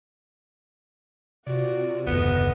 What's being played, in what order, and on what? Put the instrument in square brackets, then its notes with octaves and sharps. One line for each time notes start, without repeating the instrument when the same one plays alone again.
[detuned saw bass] C3 [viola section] F4 F#4 [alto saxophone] D5
[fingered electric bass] F#1 D#2 [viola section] A3 D#5 [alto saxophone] B3